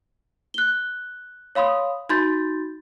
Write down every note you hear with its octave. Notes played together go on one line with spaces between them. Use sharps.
F#6 G7
C#5 F5 B5 C6 D#6
D#4 F#4 B5 C6 G6 A6